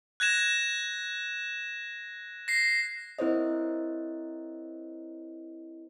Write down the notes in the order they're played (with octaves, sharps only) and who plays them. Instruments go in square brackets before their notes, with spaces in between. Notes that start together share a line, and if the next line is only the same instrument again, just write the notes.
[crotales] F#6 G#6 A#6 E7
A#6 C7
[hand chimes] C4 E4 A#4 C5 C#5 D#5